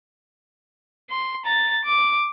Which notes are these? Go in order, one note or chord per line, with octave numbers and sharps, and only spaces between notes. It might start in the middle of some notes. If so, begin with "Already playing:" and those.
C6
A#5 A6
D6